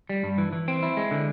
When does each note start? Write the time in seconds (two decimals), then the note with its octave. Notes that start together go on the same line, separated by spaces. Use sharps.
0.09 G3
0.24 G2
0.38 E3
0.53 E3
0.68 C4
0.83 E4
0.97 G#3
1.11 D3